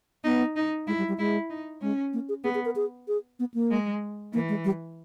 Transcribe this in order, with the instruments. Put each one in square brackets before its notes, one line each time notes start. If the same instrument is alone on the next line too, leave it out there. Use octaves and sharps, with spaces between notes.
[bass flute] B3 [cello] D#4
[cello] D#4
[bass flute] G#3 [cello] E4
[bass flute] G3
G3
[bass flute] G#3 [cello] E4
[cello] D#4
[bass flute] G#3 [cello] C#4
[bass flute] A#3
G#4
[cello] B3 [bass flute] G#4
[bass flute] G#4
A#4
G#4
G#4
B3
A#3
[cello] G#3
[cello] E3 [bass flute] A#3
[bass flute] G#3
G3